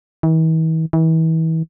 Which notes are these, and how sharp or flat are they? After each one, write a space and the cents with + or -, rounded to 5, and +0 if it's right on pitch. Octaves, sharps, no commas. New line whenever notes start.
E3 -45
E3 -35